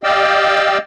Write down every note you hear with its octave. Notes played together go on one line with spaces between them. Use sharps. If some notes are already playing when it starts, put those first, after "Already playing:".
G4 D5 D#5 F5 G5 E6